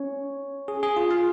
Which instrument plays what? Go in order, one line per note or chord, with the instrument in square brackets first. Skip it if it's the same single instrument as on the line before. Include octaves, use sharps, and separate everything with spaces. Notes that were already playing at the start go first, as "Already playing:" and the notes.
Already playing: [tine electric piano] C#4 C#5
G#4
G#4
F4
F4 F5